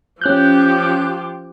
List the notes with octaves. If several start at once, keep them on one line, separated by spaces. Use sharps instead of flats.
F3 C#4 G4 F#6 G6